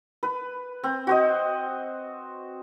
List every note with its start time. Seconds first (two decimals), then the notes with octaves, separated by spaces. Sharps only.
0.23 B4
0.84 C4
1.07 F#4 C5 D#5